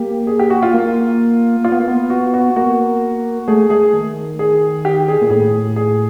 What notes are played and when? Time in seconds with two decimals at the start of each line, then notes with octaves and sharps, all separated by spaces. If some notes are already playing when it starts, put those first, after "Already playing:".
Already playing: A#3 G4
0.27 G#4
0.39 G4
0.50 F#4
0.63 F4
0.74 A#3
1.64 F4
1.72 B3
1.79 A#3
1.88 B3
2.10 F#4
2.34 F#4
2.56 A#3 F#4
3.48 A3 G#4
3.70 A3 G#4
3.94 D#3
4.39 G#4
4.85 G4
5.08 G#4
5.22 A#2
5.30 A2 G#4
5.76 G#4